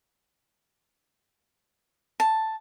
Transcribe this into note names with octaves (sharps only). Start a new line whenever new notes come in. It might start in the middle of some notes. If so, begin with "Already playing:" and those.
A5